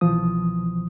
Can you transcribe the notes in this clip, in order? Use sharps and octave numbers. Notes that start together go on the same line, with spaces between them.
C2 B2 E3 F3 D#6